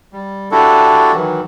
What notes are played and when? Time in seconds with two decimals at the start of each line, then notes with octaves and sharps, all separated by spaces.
0.13 G3
0.51 D4 E4 F#4 G4 A4
1.14 D#3 E3 F#3